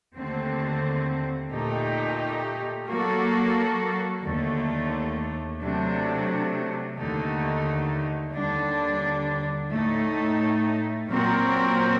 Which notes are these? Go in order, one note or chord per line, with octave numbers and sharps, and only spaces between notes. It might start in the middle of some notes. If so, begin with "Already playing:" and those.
D#2 D3 A3 C4
A#2 A3 D#4 G4
F#3 A#3 F#4 A4
D#2 D3 A3
C3 F#3 A3 D4
D#2 D3 A3 D#4
D#2 D3 G3 D4
A2 A3 D#4
A#2 F#3 C4 F#4 A#4